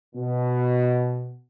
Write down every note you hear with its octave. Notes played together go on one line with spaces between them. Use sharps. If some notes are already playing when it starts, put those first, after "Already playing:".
B2